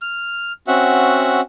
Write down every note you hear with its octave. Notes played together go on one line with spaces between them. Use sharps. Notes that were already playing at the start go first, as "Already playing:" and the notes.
F6
C4 C#4 F#4 E5 F#5